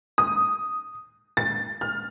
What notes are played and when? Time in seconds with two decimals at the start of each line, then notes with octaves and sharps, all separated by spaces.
0.18 D#6
1.37 A6
1.81 F6